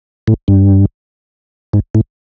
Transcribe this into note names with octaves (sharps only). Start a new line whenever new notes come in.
A2
G2
G#2
A2